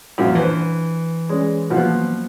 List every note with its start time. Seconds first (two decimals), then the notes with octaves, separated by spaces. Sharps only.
0.18 F#2 A#2 F3
0.35 E3 D4 B4 C5
1.29 G#3 C#4 C#5 D5
1.70 B2 F3 F#3 A#3 B3